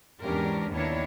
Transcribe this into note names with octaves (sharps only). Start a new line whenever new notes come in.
E2 G#2 C#4 D4 G4 A#4
D#2 D#3 B3 D4 E4 C#5